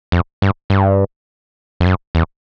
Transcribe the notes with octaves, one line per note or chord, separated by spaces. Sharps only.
F2
G2
G2
F2
F#2
E2